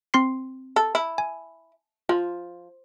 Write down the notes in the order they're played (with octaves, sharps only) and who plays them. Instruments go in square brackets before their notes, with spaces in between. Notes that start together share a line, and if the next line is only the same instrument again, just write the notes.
[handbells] C4 C6 C7
[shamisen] A4
E4
[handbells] G#5
[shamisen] F3 [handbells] F4